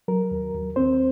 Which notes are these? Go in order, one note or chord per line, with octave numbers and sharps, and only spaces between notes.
F#3 A#4
D#2
D#2
D#2 C4 C5